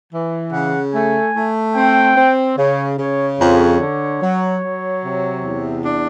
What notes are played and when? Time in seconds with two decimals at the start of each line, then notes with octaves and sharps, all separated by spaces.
0.13 E3
0.53 C#3 F#5
0.95 A3 G#5
1.36 A3
1.76 C4 G5
2.17 C4
2.58 C#3 C#5
2.98 C#3 C#5
3.39 F2 C#5
3.80 D3
4.22 F#3
4.62 F#3
5.04 C3
5.44 E2
5.85 D4